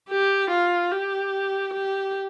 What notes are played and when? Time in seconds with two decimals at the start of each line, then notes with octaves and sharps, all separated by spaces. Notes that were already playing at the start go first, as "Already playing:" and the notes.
0.10 G4
0.50 F4
0.92 G4
1.73 G4